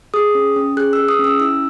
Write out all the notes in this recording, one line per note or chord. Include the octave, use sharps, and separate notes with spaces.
G#4 D#6
C#4
C#4
G#4 F#6
E6
G#4
D#6
C#4
E6
E4 E6